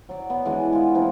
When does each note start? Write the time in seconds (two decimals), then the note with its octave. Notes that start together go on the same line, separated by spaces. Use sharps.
0.09 F#3 D5
0.30 B3
0.45 E3 G#3 D4 F#4
0.73 G#3 F4
0.94 E3 A#3 C4 D4